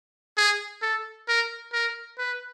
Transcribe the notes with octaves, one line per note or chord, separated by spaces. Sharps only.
G#4
A4
A#4
A#4
B4